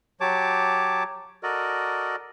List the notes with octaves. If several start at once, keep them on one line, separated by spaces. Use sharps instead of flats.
F#3 G4 C#5 A5 D6
F#4 A4 A#4 D5 D#5